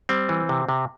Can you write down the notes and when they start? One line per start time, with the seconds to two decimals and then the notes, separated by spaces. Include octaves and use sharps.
0.09 G3 C4
0.29 E3
0.49 C3
0.69 C3